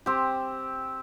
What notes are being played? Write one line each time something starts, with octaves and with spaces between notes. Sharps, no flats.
C4 G4